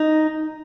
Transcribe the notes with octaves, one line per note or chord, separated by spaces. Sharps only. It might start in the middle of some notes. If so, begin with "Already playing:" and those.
Already playing: D#4